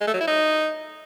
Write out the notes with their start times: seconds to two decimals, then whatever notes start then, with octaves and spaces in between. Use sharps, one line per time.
0.01 G#3
0.07 A3
0.14 F#3
0.21 E4
0.27 D#4